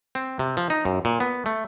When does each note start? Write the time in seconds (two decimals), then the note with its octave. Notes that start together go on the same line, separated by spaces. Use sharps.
0.15 C4
0.39 C3
0.57 F3
0.70 D#4
0.85 F#2
1.05 A#2
1.20 B3
1.46 A3